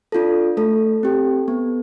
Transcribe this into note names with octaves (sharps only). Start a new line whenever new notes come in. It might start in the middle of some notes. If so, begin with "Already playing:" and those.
D4 F4 A4
A3 A4
C4 G4
B3